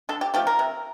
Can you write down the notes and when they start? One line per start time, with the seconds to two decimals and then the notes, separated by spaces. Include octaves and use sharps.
0.09 D3 A4
0.21 G4
0.34 F3 A3 G4
0.47 A#4
0.59 C3